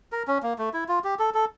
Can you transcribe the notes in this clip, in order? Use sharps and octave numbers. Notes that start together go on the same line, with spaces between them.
A#4
C#4
A#3
A3
E4
F4
G4
A4
A4